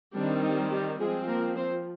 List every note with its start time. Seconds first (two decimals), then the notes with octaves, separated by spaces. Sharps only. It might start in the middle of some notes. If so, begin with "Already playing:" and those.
0.15 D#3 G3 C4 D4
0.42 D#4
0.71 G3 G4
0.99 F3 G#3 C4 G#4
1.28 A#3 A#4
1.56 C4 C5